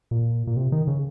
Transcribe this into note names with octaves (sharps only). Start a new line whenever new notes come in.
A#2
A#2
C3
D#3
C#3